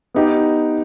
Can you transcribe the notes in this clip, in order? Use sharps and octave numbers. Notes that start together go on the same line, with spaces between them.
B3 D#4 G4